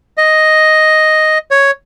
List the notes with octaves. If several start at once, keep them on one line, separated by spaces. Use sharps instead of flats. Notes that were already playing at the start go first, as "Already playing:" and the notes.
D#5
C#5